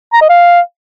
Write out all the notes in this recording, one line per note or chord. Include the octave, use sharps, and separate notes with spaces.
A#5
D#5
F5